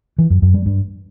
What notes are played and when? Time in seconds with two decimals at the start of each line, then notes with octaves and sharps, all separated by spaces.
0.18 E3
0.30 F#2
0.42 F#2
0.54 G3
0.66 G2